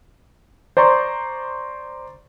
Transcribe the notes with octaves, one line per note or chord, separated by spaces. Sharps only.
C5 D5 A#5 C6 C#6